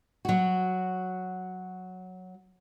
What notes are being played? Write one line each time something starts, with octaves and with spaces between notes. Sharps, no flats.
F#3 F#4